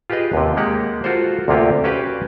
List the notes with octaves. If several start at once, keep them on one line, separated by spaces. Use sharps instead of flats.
F4 G4 G#4 B4 D#5
D#2 C3
G#3 A#3 G4 F#5
F4 F#4 A4 A#4 C5
D2 C3 A#3 F4 G4
C#4 F#4 G4 B4 F5 G5